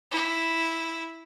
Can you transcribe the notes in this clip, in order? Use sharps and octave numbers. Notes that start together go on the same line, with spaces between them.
E4